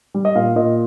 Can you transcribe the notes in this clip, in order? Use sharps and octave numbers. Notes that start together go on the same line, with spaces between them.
G3
D#5
A#2 F5
A#2 D#5